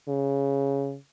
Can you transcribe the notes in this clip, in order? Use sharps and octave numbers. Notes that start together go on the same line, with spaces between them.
C#3